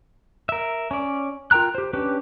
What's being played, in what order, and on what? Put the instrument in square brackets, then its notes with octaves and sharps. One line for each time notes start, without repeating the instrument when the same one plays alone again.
[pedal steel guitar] A#4 E5
C#4 D5
F4 A#4 G5 A#5 F#6
G4 C5
C#4 D4 G4 B4